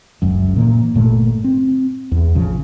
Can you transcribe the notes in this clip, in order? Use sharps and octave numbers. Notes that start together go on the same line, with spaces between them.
F#1 C#2 F#2
A#2 E3 A#3
G1 A#2 A3
C4
E2
A1 C#3 F3